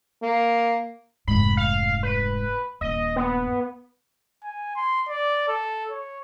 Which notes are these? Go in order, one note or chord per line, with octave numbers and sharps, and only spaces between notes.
A#3
F1 G#2 B5
F5
B4
D#1 G2 D#5
B3
G#5
C6
D5
A4
C#5